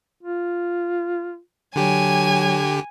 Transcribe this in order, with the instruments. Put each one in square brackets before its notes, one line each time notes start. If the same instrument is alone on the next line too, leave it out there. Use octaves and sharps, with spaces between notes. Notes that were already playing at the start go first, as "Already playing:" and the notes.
[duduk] F4
[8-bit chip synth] D3 G4 [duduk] F#3 [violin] G#5 G#6